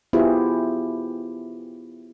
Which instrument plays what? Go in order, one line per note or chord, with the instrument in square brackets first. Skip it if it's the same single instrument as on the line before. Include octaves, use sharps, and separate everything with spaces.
[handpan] B3 E4 F4 G4 G#4 C5